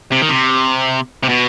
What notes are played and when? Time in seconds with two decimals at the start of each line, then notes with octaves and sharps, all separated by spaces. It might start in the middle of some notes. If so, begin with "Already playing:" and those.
0.12 C3
0.21 D#3
0.29 C3
1.23 C3
1.29 B2